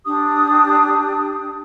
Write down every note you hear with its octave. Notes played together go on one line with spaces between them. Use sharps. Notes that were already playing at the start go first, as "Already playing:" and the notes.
D4 G4 D#6